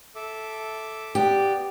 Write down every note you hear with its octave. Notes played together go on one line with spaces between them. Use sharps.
A4 E5 D6
B3 G4 D5